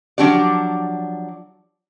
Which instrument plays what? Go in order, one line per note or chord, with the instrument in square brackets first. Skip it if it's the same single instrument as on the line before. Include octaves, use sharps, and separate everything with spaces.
[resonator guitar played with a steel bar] F3 F#3 D4 G4 D5